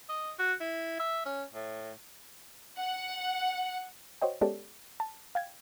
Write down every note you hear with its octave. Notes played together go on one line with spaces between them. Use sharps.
D#5
F#4
E4
E5
C#4
A2
F#5
F#4 C5 C#5 D#5 G5
G#3 B3 C#4 G4 A4 D5
A5
F5 G5 G#6